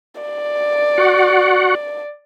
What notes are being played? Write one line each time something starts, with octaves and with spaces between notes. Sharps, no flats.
D5
F#4 F#5